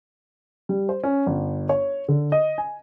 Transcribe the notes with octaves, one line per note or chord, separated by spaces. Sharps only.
G3
C5
C#4
G1
C#5
D3
D#5
G#5